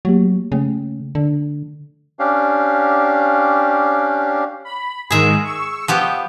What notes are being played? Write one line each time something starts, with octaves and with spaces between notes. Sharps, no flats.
F#3 A3 A#3 G4
C#3 F3 A3
D3
C#4 D4 G4 F5
B5
G#2 D#3 G#3 G#4 E5
C#6 E6
F3 B3 G4